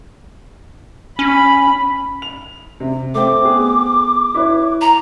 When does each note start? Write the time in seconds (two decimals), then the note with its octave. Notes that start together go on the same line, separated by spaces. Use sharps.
1.19 C#4 B5
2.22 F7
2.80 C3
3.15 A3 C4 G5 D6
3.45 B3 G#4
4.35 E4 B4 C#5
4.81 A#5